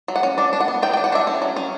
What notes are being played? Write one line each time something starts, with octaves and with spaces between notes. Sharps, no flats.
F#3
F#5
C#4
D4 D5
D4
F#5
B3
F#3 G5
G5
D4
F#5
D4 E5
C#4
F#3
C#4